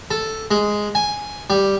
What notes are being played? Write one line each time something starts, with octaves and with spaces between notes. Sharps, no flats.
A4
G#3
G#5
G3